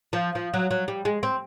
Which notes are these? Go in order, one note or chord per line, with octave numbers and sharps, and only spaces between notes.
F3
F3
F#3
F#3
G3
G#3
C4